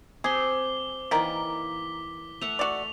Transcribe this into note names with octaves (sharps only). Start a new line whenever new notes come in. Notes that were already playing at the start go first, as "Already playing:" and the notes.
C4 G4 G#4 D6 G7
D#3 E3 A#3 A#4 D5 B6
A3 E5 F#5 F7
F#4 D5